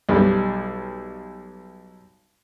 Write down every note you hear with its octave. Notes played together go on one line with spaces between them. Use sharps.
B1 G3